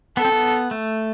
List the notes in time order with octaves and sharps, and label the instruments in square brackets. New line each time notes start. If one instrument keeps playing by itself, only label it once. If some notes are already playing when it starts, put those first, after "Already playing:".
[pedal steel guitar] B3 [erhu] A4
[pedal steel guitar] C4
B3
A3